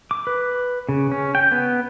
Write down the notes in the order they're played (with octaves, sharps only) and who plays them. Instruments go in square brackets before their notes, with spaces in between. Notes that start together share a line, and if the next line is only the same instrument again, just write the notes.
[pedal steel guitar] D6
B4
C#3
C#4
G5
B3